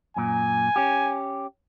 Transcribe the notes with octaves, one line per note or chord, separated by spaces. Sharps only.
F#2 A#2 G#5
C#4 G4